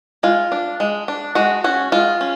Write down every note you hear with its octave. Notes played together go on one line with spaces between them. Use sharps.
G#3 F4
D4
G#3
D4
G#3 F#4
C#4 F#4
G#3 F4
C#4